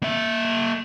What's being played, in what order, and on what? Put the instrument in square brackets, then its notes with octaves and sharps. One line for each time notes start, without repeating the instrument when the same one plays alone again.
[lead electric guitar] A#3 E5